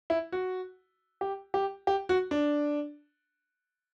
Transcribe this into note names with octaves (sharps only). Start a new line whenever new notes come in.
E4
F#4
G4
G4
G4
F#4
D4